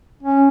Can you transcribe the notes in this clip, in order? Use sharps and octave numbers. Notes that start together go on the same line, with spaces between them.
C#4